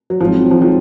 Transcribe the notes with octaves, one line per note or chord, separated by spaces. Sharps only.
F#3
G#1 G#2 F3 F#3 C4
F3
F3